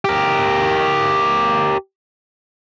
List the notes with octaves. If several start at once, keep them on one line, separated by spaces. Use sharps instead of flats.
G4 A#4